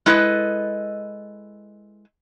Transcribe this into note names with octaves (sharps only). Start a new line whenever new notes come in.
G#3 E4 A4 B4 D#5